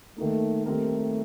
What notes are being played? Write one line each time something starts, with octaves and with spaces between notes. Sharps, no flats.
D#3 A3 A#3 D#4
D#3 G3 A3 C4 G4 A#4